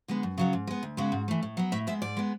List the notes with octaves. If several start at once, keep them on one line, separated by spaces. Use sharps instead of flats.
D3 G#3 B3
F#2
C#3 F#3 B3
G#2
G#3 B3
D2
C#3 G#3 B3 F#4
G#2
E3 A3
A2
F#3 B3
A2 E5
G#3 B3 E5
G#2 D5
G#3 B3